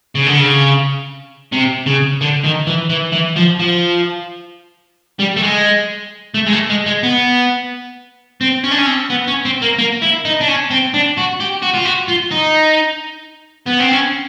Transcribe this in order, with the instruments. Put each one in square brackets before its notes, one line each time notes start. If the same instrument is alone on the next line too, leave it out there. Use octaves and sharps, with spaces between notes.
[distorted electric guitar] C#3
D3
C#3
C3
C#3
D3
D#3
E3
E3
E3
F3
F3
G3
A3
G#3
A3
G#3
A3
G#3
G#3
B3
C4
C#4
D4
C#4
C4
B3
C#4
C4
A#3
A#3
E4
D#4
D4
C#4
C4
D4
F#4
G4
F#4
F4
F#4
F4
D#4
B3
C4
C#4